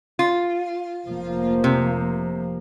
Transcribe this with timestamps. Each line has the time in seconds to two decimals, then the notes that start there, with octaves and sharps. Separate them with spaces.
0.19 F4
1.07 F1 F3 A#3
1.64 C3